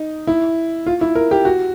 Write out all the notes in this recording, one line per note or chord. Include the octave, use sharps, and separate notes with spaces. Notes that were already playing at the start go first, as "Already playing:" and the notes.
Already playing: D#4
E4
F4
E4
A#4
G4
F#4